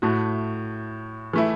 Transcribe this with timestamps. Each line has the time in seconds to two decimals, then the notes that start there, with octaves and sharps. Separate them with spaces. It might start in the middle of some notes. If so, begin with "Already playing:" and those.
0.02 A2 A3 F#4
1.33 E3 A3 E4